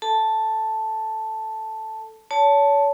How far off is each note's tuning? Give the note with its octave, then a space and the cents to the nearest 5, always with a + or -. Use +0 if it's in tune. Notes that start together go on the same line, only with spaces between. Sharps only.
A4 +0 A5 +0
C#5 +35 A5 +0